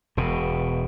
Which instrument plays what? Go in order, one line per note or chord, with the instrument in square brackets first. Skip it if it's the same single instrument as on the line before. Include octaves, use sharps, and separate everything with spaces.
[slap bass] E1 B2